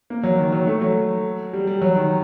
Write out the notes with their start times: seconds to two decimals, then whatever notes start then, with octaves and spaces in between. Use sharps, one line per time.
0.10 A#3
0.23 F#3
0.38 D#3
0.52 F#3
0.67 A3
0.81 F#3
1.53 G3
1.67 G3
1.81 F#3
1.96 D#3